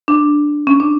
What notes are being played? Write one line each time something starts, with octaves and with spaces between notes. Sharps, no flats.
D4
C#4
D4